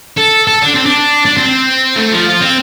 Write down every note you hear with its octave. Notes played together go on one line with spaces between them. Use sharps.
A4
A4
D4
C4
D4
D4
C4
A3
F3
F4
C4